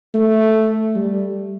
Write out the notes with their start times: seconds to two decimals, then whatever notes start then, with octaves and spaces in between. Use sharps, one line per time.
0.14 A3
0.95 G3